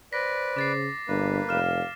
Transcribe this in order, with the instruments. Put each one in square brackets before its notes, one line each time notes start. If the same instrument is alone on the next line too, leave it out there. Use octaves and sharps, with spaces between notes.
[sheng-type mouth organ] B4 D5 [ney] C5 [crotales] A#6 B6
[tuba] C#3 [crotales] D6 A6 C7
[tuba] G1 [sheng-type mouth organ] A#3 B4 [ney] D4
[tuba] F1 [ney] F5 [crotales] F6 E7